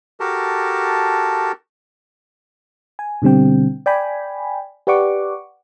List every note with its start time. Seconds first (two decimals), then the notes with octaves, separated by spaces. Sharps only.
0.20 F#4 G4 A4 A#4 A5
2.99 G#5
3.22 B2 D3 G3 C4 G5
3.86 D5 G5 G#5 B5
4.87 G4 B4 D5 F#5 C#6 D6